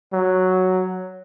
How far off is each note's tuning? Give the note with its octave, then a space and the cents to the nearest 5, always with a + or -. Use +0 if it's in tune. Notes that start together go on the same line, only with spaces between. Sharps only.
F#3 +0